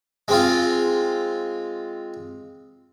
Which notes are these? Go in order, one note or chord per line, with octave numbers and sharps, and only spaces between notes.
G#3 C4 F4